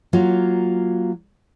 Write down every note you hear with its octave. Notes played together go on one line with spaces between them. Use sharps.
F#3 A#3 F4